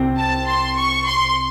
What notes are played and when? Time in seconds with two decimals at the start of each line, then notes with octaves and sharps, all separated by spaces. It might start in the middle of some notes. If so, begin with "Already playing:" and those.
Already playing: C2 C3 C4
0.18 A5
0.47 C6
0.76 C#6
1.05 C6